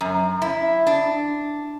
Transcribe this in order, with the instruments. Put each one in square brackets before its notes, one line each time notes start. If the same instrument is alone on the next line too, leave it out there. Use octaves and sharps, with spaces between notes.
[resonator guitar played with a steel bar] F#2
E4
D4